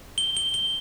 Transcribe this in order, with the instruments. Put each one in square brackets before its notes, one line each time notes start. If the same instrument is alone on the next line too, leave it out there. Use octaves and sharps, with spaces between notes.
[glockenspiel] G7
G7
G7